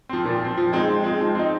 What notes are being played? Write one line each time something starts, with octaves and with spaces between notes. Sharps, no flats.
F3 C4
A#2
F3 C4
F3
G#3 C4 D#4
F3
G#3 C4 D#4
F3
C4 D#4